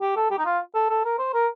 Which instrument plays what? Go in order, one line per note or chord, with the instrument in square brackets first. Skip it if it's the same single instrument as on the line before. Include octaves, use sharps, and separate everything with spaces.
[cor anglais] G4
A4
G4
D#4
F4
A4
A4
A#4
C5
A#4